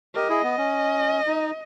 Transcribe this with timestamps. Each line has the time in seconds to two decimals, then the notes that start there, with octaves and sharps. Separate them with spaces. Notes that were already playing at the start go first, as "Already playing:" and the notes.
0.15 G4 A#4 D#5
0.29 E4 G#4
0.43 B3
0.58 C#4
1.27 D#4